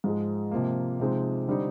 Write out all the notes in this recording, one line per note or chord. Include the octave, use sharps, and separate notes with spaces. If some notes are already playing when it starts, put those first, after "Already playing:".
G#2 F3 G#3
C3 F3 A#3
C3 F3 G#3 C4 D#4
D3 G3 C4 D#4